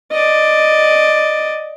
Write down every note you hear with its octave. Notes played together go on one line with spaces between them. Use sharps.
D5 D#5